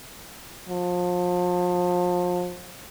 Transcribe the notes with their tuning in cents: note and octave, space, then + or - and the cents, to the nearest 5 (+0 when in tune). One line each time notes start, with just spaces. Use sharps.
F3 +35